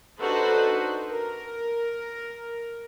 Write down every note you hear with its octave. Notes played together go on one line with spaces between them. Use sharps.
D4 D#4 F#4 A4 B4 C5
A#4